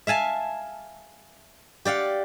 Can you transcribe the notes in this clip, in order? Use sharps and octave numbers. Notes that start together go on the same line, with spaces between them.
E5 F5 G#5 A5
G4 D5 F5 F#5